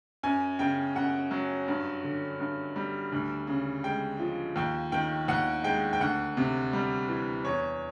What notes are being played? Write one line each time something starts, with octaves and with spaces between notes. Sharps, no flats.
F#2 G#5
C#3 G5
F#2 F#5
F#3
G2
D3
G2
G3
D2
C#3
G#3 G5
F3
D#2 G5
D#3 G5
D#2 F#5
G#3 G5
G5
D2 F#5
C3
G3
E3
E2 C#5